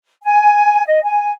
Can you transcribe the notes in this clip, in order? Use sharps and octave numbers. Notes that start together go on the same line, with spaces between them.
G#5
D#5
G#5